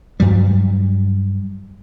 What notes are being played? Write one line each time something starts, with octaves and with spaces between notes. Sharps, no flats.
G2 F#3 G3